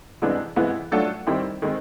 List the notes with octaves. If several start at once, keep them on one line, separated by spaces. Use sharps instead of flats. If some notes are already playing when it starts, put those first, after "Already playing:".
C3 E3 G#3 B3 D4
C3 E3 G#3 B3 E4
F#3 A3 D4 F4 A4
D#3 G3 C4 E4 G4
D#3 G#3 C4